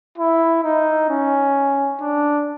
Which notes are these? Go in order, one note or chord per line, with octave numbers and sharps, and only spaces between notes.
E4
D#4
C#4
D4